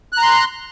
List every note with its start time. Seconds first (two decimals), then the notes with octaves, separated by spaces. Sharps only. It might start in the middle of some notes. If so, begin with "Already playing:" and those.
0.13 F#6
0.17 A#5
0.22 C6